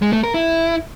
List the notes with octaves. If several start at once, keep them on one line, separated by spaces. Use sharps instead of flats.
G#3
A3
A#4
E4